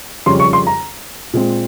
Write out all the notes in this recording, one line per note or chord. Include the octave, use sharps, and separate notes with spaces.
F2 C#3 G3 C#4 C6
C#6
C6
A#5
A#2 G#3 C4